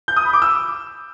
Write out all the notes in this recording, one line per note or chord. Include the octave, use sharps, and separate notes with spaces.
G6
D#6
B5
D6
E6